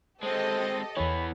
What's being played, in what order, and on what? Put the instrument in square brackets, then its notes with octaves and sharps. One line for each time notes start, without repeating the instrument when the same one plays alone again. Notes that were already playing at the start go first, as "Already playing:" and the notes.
[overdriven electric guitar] G#3 C4 [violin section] G4 A4 D#5 [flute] C5
[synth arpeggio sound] E2 C#5 [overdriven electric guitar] E3 B3 [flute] B5